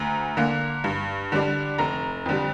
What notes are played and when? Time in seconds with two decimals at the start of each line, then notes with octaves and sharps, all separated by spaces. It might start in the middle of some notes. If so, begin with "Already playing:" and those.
Already playing: D2 A#5
0.37 D3 A#3
0.84 G2
1.32 D3 G3 D4
1.78 F1 A#5
2.26 F2 D3 G3